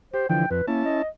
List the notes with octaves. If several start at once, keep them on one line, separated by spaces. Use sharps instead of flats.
G4 C5
D3 E3 F3 G5
F2 B4
A#3 C#4 E4 A5
D#5